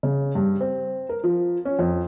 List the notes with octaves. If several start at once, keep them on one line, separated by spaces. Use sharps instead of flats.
C#3
G2
C4
A#4
F3
C#4
F2